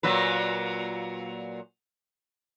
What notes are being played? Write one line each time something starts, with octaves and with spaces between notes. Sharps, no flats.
A#2 F#3 B4